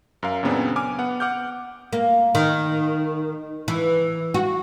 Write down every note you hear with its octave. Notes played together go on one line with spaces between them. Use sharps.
F#2 A#4 F5
F#2 A#2 C#3 B3 C4 D4
G#5 D6 F6
B3 F#5
F#5 D6 F6 G6
A#3
D#3
E3
F#4